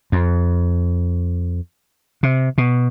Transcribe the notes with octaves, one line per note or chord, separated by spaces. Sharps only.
F2
C3
B2